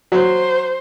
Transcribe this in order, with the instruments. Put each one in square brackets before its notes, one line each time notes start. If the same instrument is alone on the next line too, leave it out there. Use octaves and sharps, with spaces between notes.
[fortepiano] F#3 [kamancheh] C5